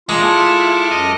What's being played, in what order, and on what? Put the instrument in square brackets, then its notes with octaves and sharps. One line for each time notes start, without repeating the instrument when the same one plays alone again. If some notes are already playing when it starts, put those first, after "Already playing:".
[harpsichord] G#3 [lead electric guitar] A#3 D4 [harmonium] F4 [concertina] G#4 C#6
[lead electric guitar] E4 [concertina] A4 D6 F6
[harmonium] F#2 [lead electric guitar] D#5